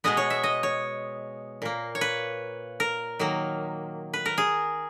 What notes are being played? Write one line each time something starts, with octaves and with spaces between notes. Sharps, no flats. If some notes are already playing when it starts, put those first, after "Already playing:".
B2 G#3 B3 D#5
C#5
E5
D#5
C#5
A#2 A#3
C#5
B4
A#4
D#3 F#3 A#3
B4
A#4
G#4